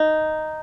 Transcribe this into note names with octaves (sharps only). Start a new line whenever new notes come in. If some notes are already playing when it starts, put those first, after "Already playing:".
Already playing: D#4